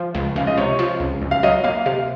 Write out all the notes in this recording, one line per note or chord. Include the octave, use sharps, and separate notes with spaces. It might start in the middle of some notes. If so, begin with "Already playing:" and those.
Already playing: F3
C#2
C#2 F5
D#5
C3 C#5
F3
C#2
C#2
F5
F#3 D#5
A#3 F5
C3 F5